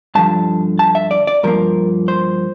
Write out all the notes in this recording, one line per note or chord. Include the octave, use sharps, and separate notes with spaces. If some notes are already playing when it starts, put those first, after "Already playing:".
G2 D3 F3 A5
A5
E5
D5
D5
G2 F3 A#3 A#4
C5